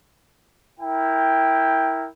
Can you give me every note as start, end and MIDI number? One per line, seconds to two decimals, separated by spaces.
0.80 2.07 64
0.80 2.07 70
0.80 2.07 79